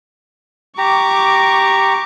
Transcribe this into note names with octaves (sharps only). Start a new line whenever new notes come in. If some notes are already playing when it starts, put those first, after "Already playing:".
G4 A#5 C#6 D6